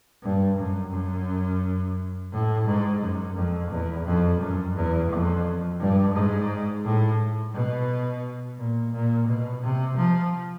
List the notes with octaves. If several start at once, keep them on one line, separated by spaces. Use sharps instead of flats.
G2
F#2
F#2
A2
G#2
F#2
F2
E2
F2
F#2
E2
F2
G2
G#2
A2
B2
A#2
A#2
B2
C3
F3